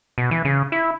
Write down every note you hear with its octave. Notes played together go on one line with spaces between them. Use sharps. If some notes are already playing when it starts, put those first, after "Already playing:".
B2
E3
C#3
E4